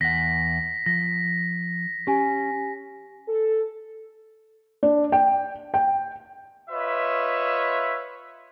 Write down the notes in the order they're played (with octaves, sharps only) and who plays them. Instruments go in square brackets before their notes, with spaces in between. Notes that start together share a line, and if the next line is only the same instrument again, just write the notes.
[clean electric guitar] E2 F#5 [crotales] A#6 B6
[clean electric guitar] F3 [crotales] A#6
[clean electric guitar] C#4 [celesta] G4 G#5
[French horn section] A4
[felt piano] D4
G5
G5
[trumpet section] F4 B4 C#5 D#5 E5